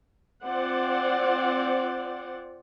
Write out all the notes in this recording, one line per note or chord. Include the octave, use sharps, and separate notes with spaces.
C4 F4 C5 D5 F#5